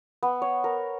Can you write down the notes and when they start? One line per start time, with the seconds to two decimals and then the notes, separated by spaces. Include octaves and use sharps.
0.23 B3
0.42 C#5
0.64 A#4